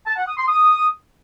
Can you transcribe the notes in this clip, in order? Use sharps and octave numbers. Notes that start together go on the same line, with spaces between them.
A5
F#5
D#6
C6
D#6